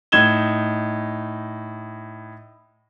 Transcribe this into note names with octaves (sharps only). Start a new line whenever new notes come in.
A2 D#4 G#6 E7 G7